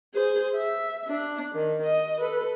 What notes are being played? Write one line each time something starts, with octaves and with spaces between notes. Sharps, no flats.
G#4 C5
E5
D4
D#3
D#5
A4 B4